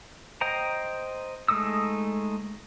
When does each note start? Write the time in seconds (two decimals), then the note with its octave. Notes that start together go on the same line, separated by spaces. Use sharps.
0.41 C5 D#5 G5 A#5
1.48 G#3 A3 D#4 D#6 E6